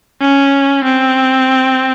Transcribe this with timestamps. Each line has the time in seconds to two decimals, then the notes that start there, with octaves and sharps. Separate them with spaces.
0.21 C#4
0.84 C4